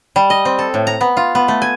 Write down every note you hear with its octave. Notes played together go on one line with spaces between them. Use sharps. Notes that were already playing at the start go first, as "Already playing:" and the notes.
G3
D#5
C4
A4
A2
A#5
B3
F4
B3
A3
G#5